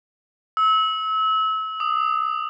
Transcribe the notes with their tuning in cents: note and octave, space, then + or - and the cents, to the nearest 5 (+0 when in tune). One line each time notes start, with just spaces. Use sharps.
E6 -30
D#6 -20